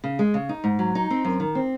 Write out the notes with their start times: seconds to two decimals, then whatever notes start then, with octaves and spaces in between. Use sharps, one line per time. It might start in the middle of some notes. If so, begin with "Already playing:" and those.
0.04 C#3
0.19 G#3
0.34 C#3
0.49 D#4
0.64 G#2
0.79 F#3
0.95 D#4
1.11 C4
1.25 F#2
1.40 D#3
1.55 C4